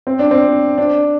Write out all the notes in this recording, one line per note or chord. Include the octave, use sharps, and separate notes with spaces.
C4
D4
C4
D4